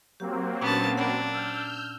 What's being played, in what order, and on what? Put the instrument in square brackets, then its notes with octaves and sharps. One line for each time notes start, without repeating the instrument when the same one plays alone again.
[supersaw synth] F#3 A#3 C4 [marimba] G4
[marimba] A#2 C#4 D4 [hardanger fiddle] B3 A5
[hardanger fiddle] D4 [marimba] F#5 G5 B5
[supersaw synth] E6 F6 G6